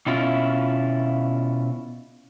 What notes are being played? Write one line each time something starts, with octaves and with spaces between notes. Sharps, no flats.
B2 C#4 E4 F4